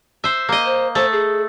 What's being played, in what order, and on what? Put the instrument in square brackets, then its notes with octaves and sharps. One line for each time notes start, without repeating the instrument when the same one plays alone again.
[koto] C5 E5
A#3 D#5
[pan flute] C5
[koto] A3 [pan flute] C5
[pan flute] G#4